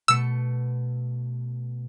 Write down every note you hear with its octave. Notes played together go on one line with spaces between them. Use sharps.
B2 A3 E6 C#7